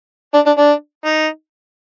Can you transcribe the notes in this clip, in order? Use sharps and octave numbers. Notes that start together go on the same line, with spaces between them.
D4
D4
D4
D#4